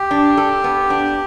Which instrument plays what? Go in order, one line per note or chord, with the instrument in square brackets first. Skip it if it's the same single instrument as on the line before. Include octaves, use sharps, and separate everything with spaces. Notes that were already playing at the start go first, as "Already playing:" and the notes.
Already playing: [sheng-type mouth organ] G4
[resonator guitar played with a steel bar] D4
A4
B3
D4